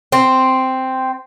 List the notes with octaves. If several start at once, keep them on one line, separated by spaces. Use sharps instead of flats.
C4